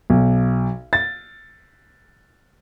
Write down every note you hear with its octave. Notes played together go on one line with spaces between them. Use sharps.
B1
A6